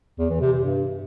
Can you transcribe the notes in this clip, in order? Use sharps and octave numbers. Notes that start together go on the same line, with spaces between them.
E2
E3
C3
C3
G2